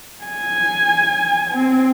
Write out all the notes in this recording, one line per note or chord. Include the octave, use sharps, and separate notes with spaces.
G#5
C4